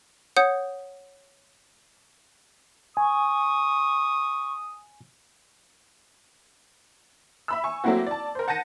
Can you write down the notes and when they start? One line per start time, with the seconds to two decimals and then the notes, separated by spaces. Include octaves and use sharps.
0.37 C#5 F#5 D#6 G6 C#7
2.97 G#5 C#6 D#6
7.48 E5 B5 E6
7.64 G#5 C#6
7.84 F#3 A3 A#3 C4 E4 F#4
8.07 D5 A5
8.35 A#4 C5
8.48 F#5 A5 G6 A#6 D#7